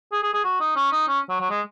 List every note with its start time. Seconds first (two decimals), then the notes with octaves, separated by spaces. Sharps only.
0.12 G#4
0.23 G#4
0.33 G#4
0.44 F#4
0.60 D#4
0.75 C#4
0.92 D#4
1.08 C#4
1.29 F#3
1.40 F#3
1.50 G#3